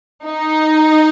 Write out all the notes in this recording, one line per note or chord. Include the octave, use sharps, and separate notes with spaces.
D#4